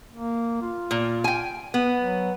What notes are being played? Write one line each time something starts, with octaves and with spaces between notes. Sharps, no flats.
A#3
F4
A#2
G5 G#5
B3
F#3